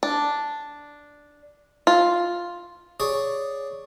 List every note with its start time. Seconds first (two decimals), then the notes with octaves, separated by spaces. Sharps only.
0.03 D4
1.87 F4
3.00 G#4 C#5 D5